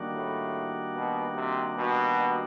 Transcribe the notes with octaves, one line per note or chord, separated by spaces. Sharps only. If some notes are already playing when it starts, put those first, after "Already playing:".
Already playing: D#3 G3 A#3 D4 F#4
A2
B2
C3
B2